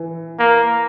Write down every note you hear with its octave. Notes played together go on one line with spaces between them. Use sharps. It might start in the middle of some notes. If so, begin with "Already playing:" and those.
Already playing: E3
A#3